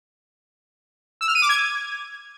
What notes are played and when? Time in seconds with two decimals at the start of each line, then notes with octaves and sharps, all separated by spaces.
1.21 E6
1.28 F6
1.35 D#7
1.42 D6
1.49 G#6